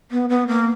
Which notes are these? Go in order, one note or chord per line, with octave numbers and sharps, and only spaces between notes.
B3
B3
A#3